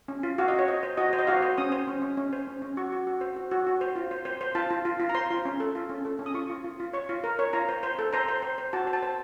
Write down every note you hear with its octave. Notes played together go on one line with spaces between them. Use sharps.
C#4
F4
F#4 F5
D#5
F#4 C#5
C5 D#5
C5
F#4 D#5
C5
D#5
F#4 F5
C5
C#4 D#6
C5
C#4
C#4
C#4
C5
C#4
C#4
F#4 C#6
F#4
F#4
C5
F#4
F#4
F#4
C5
F4
C5
C5
C5
F4 A5
F4
F4
F4
A#5
C5 C6
F4
C#4
A4
F4
C#4
A4
C#4
D#6
F4 C#6
F4
F4
F4
C#5 C#6
F4
A#4
C#5
F4 A#5
C5
C5
A4
C5 A#5
C5
C5
C5
F#4 A5
C5
A5
C5